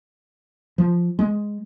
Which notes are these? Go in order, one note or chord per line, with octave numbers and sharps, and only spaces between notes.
F3
G#3